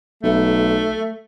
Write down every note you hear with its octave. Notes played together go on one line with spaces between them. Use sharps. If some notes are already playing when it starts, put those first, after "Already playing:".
B1 A3